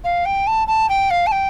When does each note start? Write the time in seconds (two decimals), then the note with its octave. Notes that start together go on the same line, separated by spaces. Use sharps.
0.04 F5
0.25 G5
0.47 A5
0.67 A5
0.89 G5
1.10 F5
1.26 A5
1.31 G5